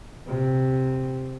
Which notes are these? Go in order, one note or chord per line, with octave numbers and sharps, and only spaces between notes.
C3